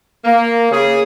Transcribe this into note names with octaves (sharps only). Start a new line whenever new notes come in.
A#3
C#3 G#4